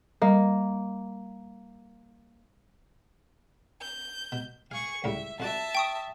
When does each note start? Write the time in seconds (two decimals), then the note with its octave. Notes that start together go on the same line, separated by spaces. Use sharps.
0.22 G3 A#3
3.81 G6
4.32 B2
4.71 G#4 F5 C#6
5.04 C#2 A2 G3 E5
5.40 F2 F#4 D5 E5 A5
5.75 G5 C#6 D#6